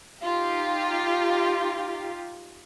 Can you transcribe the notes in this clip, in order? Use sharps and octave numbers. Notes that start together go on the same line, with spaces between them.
D#4 F4 G4